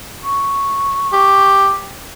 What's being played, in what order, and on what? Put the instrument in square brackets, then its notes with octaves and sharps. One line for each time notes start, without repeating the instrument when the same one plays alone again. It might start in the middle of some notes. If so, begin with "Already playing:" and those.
[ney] C#6
[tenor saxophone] G4